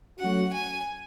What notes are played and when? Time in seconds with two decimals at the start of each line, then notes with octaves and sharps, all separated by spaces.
0.19 F#3 A3 C#4 F#4 F#5
0.53 G#5